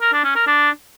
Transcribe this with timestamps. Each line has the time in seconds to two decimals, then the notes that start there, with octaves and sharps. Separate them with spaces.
0.01 A#4
0.13 D4
0.24 C#4
0.35 A#4
0.47 D4